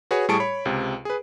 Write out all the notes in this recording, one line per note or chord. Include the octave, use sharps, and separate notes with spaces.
F#4 G#4 B4 C#5
A2 G3 G#4 A5 C#6 D7
C#5 B5
C#2 C3
G#4 B4